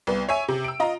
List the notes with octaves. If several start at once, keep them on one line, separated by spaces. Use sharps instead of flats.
C2 B3
C#5 E5 G#5
C3
E6 D7
F4 D#5 A#5